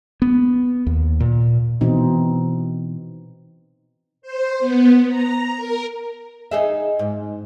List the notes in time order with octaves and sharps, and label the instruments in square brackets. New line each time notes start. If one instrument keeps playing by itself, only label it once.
[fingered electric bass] B3
D#2
A#2
[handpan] B2 E3 C4 D#4
[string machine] C5
B3
A#5
A#4
[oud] D#4 G#4 E5
G#2